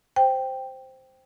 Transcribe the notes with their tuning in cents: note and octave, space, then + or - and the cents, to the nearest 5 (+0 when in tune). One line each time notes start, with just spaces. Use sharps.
C5 +0 G5 +0